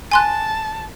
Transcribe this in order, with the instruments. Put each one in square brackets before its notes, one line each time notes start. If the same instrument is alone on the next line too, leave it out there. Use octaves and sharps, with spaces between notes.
[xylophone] G#5 C6 F#6 [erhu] A5